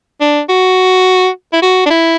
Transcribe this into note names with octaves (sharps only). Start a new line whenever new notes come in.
D4
F#4
E4
F#4
D4
E4